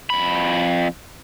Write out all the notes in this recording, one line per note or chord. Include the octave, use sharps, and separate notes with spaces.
F2 B5